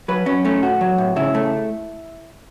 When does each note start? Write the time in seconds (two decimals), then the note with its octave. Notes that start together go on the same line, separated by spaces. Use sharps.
0.08 F#3 B4
0.26 F#3 C#4
0.45 A3 C#4
0.62 A2 F#4
0.81 F#3
0.98 A2
1.16 C#3 E4
1.35 A3